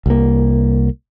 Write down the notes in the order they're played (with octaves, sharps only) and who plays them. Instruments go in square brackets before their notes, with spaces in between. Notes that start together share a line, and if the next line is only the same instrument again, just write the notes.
[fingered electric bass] C2 A#3